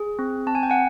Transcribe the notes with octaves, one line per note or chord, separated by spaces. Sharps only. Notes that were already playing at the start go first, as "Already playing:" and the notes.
Already playing: G#4
C4
C4 A5
G#5
G5
F#5 G#5